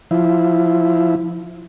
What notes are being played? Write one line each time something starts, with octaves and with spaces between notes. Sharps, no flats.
F3 E4